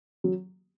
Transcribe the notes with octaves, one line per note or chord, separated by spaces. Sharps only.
F#3